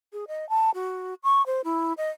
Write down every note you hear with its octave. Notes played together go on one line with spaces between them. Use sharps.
G#4
D#5
A5
F#4
C#6
C5
E4
D#5